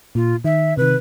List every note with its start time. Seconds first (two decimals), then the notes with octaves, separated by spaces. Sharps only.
0.15 A#2 F4
0.44 D#3 E5
0.77 C3 D#3 B4